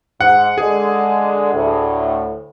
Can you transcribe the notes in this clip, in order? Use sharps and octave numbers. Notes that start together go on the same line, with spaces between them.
G#2 F#5
D3 G#3 G#4
D2 A2